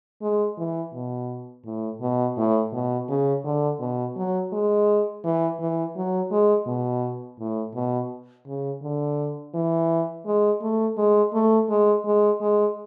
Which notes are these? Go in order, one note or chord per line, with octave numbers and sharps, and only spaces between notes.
G#3
E3
B2
A2
B2
A2
B2
C#3
D3
B2
F#3
G#3
E3
E3
F#3
G#3
B2
A2
B2
C#3
D3
E3
G#3
A3
G#3
A3
G#3
G#3
G#3